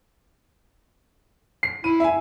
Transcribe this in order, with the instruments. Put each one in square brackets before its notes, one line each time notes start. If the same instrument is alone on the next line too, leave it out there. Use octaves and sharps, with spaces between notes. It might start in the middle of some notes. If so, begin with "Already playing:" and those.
[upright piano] C7
[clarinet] E4 [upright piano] D#7
[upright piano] E5 G#5